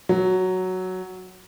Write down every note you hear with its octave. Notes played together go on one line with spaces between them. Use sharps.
F#3